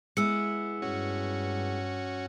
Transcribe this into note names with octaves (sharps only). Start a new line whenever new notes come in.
G#3 B3 E4 E6 C#7
G2 C#4 F#4